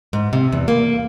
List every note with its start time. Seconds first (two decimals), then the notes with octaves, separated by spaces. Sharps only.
0.13 G#2
0.33 C3
0.52 E2
0.68 A#3